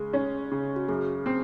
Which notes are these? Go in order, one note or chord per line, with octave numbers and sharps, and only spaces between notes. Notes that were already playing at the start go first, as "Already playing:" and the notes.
Already playing: C#3 G#3
C#4
C#3
F#4
F#2 G#4
C4